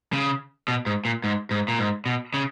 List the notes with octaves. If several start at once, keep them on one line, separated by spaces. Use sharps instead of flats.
C#3
B2
G#2
A#2
G#2
G#2
A#2
G#2
B2
C#3